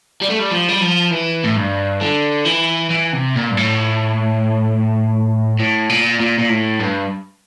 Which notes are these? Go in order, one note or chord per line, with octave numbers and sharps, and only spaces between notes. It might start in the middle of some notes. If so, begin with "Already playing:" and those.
G3
A3
G3
F3
G3
F3
E3
A2
G2
D3
E3
E3
C3
A#2
G2
A2
A2
A#2
A#2
A#2
A2
G2